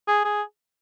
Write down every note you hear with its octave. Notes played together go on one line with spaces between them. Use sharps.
G#4
G#4